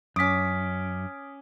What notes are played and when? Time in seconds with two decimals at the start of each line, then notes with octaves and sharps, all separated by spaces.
0.16 F#2 C#4 D6 D#6 B6